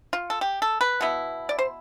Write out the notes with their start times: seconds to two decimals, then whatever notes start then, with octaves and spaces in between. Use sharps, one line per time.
0.13 F4
0.30 A4
0.41 G4
0.62 A4
0.81 B4
1.01 B2 B3 E4
1.49 D5
1.59 C5